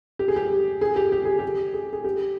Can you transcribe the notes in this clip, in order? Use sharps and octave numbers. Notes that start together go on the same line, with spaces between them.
G4
G#4
G4
G#4
G4
G4
G#4
G4
G#4
G#4
G4